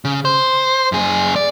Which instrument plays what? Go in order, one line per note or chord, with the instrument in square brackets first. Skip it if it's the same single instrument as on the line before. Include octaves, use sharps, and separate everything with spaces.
[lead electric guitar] C#3
C5
F#2 G#4
D5